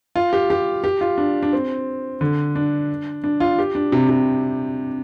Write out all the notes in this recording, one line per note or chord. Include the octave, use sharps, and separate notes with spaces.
F4
G4
G4
G4
F4
D4
D4
C4
D3
D4
D4
F4
G4
D4
C3
C3